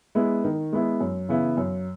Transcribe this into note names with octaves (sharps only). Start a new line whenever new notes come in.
G#3 B3 E4
D#3
G#3 B3 E4
F#2
C#3 E3 B3 E4
F#2